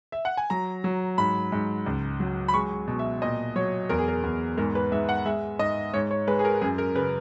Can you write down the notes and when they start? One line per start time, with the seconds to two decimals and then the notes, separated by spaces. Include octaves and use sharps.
0.12 E5
0.25 F#5
0.37 G#5
0.50 F#3 A#5
0.84 F#3
1.18 G#2 B5
1.52 G#2
1.86 C#2
2.20 F#3
2.48 B5
2.54 G#3 C#6
2.88 B2
2.99 E5
3.22 A#2 D#5
3.56 F#3 C#5
3.89 E2 A#4
3.98 G#4
4.08 A#4
4.23 E2
4.57 G#2 A#4
4.75 B4
4.92 G#2 E5
5.09 F#5
5.26 G#3 E5
5.59 G#2 D#5
5.94 G#2 C#5
6.11 C#5
6.27 G#3 B4
6.39 G#4
6.45 A#4
6.61 F#2 G#4
6.78 A#4
6.95 C#3 B4